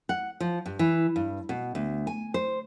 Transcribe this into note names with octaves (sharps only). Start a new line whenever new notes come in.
F#5
F3
G2
E3
G2
B2
D2
G#5
C5